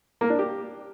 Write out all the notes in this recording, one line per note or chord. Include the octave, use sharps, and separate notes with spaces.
A#3
D4
G4